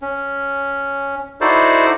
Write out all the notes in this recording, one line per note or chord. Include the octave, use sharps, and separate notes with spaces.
C#4
D#4 E4 F#4 A4 C5 D5